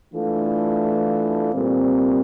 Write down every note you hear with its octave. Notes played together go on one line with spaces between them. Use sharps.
E3 A3 D4 F4 A4
A#2 G3 C4